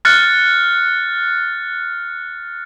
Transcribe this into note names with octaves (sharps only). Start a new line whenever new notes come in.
F6 F#6 A6 C#7